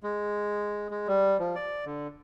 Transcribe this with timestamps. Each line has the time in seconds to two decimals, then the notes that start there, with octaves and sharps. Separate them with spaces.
0.03 G#3
0.90 G#3
1.08 G3
1.39 F3
1.55 D5
1.86 D3